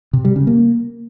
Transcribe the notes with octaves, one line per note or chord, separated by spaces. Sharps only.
C3
G3
C#3
A#3